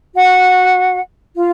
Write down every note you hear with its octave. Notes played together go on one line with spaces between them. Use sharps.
F#4 F#5
F4 F5